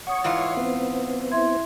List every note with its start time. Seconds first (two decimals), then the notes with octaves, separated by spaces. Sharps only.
0.07 C#5 F#5 C#6 D#6
0.24 G#2 E3 F4
0.57 B3 C4
1.32 E4 E5 C6 G#6